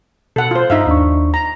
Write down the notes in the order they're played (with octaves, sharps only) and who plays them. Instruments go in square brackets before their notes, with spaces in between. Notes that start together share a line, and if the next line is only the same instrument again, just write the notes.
[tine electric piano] B2 [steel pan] A4 F#5
[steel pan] F4 C5
[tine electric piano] G2 [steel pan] D#4 E5 F5
[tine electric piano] D#2 D4 C#6
[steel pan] A#5